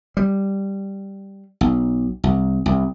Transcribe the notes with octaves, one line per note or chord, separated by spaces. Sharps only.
G3
B1
C2
C2